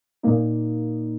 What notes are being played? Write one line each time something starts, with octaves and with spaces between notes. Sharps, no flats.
A#2 A#3 D#4